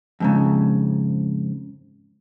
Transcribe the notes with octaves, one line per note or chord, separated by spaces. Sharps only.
F2 G#2 C#3